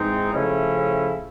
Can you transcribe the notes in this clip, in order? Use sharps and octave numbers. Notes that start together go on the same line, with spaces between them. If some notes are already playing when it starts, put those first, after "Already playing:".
Already playing: G#2 E3 G#3 C4 D#4
C#3 F3 A3 C#4 E4